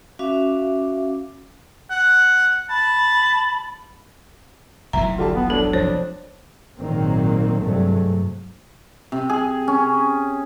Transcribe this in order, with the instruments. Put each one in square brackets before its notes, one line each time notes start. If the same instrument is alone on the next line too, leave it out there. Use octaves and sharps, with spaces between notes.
[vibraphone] C#4 F#4 E5 F5 D6
[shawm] F#5
[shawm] A5 [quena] B5
[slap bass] F1 B1 E3 [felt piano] E5 [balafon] A#5
[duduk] D3 [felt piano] F4 G4 A5
[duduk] B3
[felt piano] F#3 [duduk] D4 [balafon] A4
[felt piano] F2 [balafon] C5 C#5
[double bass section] G#1 A#2 D#3 F#3 A#3 C4
G2 C3 F#3 G#3 A3
[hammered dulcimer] C3
G#4
C#4